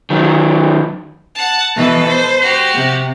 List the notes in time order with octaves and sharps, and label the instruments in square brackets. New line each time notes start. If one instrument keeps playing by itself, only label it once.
[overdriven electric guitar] D#3 F#3
[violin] F#5 A5
[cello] B2 E3 [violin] A4 B4
[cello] C5
[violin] F#4 G4
[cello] C3